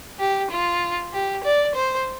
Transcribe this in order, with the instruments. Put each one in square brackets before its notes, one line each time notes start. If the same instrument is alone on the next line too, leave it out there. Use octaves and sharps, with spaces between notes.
[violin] G4
F4
G4
D5
C5